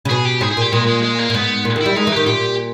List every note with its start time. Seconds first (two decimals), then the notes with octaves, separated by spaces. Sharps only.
0.05 C#3
0.09 B2 G#4
0.25 G4
0.41 G#2 G#4
0.51 G#4
0.57 A#2 G4
0.72 A#2 G#3
0.87 G#3
1.02 G#3
1.19 A#3
1.30 A#2
1.34 G#2 B3
1.65 A#2
1.76 D#3
1.81 G3 E4
1.96 G#3 D#4
2.07 E3
2.12 D#3 G4
2.26 A#2 G4